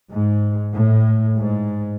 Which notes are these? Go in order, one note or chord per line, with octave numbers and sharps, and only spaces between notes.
G#2
A2
G#2